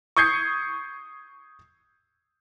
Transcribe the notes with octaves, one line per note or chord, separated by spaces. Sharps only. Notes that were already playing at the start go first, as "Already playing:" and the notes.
C#6 D#6 G6 G#6 C7 C#7